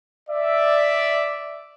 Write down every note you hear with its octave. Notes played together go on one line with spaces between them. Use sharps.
D5 E5